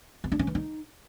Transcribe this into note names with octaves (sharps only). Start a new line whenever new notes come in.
B3
D4
C#4
E3
D#4